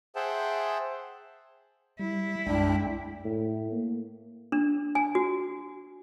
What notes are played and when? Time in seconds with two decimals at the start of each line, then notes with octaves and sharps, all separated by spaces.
0.16 G#4 C5 E5 F#5 G5 A5
1.99 G3 E4
2.47 B1 F#2 G#3 D4 G5
3.25 A2
3.73 A#3
4.52 D4
4.95 G#5
5.15 F#4